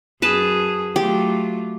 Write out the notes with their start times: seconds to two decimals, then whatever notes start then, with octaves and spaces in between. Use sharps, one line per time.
0.22 F#2 G#4 B4 A5
0.96 F#3 A3 F4 G4